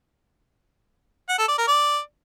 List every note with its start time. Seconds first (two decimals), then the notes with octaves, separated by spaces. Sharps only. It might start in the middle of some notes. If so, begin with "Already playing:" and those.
1.29 F#5
1.39 A4
1.49 D5
1.58 A#4
1.68 D5